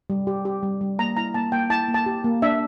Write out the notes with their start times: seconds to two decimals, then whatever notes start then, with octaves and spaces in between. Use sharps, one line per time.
0.10 G3
0.27 G4
0.45 G4
0.63 G3
0.81 G3
0.99 A#3 A#5
1.17 E4 A#5
1.34 A#3 A5
1.52 A#3 G5
1.70 E4 A5
1.88 A#3
1.94 A5
2.06 G4
2.24 A#3
2.42 D4 E5